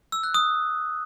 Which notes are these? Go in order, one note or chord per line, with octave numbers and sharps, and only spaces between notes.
E6
F#6
D#6